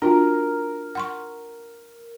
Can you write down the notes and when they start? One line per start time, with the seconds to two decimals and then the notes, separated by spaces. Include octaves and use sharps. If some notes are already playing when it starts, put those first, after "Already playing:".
0.02 D4 F4 F#4 A#4
0.95 F#5 C6 C#6